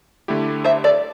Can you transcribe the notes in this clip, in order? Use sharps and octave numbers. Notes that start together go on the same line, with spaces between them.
D3 A3 E4 G4
C5 E5
A4 D5